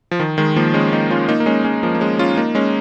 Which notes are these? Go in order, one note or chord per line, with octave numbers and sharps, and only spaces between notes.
F3
D#3
D#3 G#3
F3 A#3
G#3 C#4
A#3 D#4
C#4 F4
A#3 D#4
A#3
G#3 C#4
G#3 C#4
F3 A#3
A#3
G#3 C#4
C#4 F4
A#3 D#4
G#3 C#4